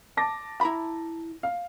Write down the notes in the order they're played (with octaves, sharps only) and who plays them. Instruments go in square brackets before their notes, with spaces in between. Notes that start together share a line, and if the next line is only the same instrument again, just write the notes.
[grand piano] A5 D6 A#6
[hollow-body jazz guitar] E4 A#5 B5
[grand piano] F5